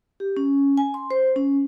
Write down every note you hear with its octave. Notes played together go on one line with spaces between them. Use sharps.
G4
C#4
G#5
C6
C5
C#4